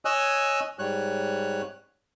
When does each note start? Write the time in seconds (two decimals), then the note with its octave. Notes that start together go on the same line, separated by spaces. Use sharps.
0.05 C#5 D#5 G#5 E6 F#6
0.79 G#2 G3 C#5 F#6